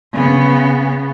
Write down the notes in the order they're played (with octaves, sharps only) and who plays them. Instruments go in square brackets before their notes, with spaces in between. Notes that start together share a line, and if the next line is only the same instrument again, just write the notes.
[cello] C#3 B3